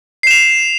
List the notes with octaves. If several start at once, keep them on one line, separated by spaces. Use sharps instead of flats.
C7 E7 F7